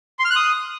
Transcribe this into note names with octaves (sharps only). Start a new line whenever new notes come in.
C6
F6
F#6
D#6